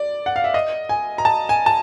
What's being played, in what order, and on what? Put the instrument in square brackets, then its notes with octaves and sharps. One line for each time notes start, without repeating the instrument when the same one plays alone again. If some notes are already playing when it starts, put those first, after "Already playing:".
Already playing: [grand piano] D5
F#5
F5
E5
D#5
G#5
A#5
A5
G#5
A5